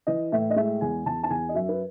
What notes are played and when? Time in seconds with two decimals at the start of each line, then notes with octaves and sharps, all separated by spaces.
0.07 E3 D#5
0.32 A2 E5
0.50 D#5
0.56 G#3 E5
0.81 E2 G#5
1.06 E2 A5
1.23 A5
1.30 E2 G#5
1.49 D#5
1.55 F#2 E5
1.69 B4